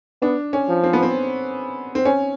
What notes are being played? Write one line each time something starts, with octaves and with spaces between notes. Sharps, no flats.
B3 D4
C#4
F3
C4
B3
C4
C4
C#4